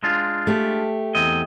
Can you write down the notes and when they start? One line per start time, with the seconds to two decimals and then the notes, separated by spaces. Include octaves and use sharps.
0.03 G#3 D4 F4
0.47 A3 G4
1.15 E2 C4 D#5